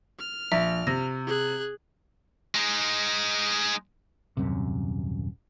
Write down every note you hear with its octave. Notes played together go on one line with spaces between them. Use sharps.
F6
A#1 E5
C3 A#6
G#4 F#6
G#3 D#4
D#1 F#2 C3